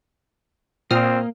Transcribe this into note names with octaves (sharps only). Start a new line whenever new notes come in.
A#2 A#3 C4 D#6 F6